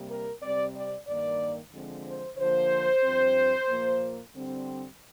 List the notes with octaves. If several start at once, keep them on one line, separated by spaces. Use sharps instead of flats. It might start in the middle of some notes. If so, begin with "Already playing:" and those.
Already playing: C3 G3 A#3
A#4
C3 G3 C4 D5
D5
G2 D#3 A#3 D5
D3 F3 G#3 C4
C5
D3 F3 A#3 C5
G2 F3 C4
A#2 F3 A#3
D3 G3 C4